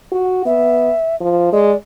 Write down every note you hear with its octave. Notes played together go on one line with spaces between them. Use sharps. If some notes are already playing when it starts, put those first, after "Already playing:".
F#4
B3 E5
F3
G#3 D5